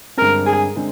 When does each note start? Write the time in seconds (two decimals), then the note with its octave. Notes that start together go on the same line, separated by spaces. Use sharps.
0.17 G2 D3 G#3 C4 A#4
0.46 G#4
0.76 D3 G#3 C4